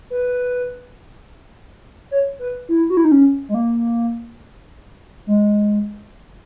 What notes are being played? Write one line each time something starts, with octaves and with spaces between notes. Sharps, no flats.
B4
C#5
B4
E4
F#4
E4
D#4
C#4
G#3
A#3
G#3